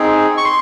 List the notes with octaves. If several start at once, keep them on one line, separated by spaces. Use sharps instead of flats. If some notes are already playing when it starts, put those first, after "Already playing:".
Already playing: C4 D#4 G#4
C#6
C6